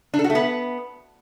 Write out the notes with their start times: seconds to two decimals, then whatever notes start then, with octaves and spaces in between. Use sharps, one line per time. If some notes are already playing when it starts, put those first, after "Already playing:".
0.14 D4
0.19 A4
0.24 F#4
0.30 A3
0.35 B3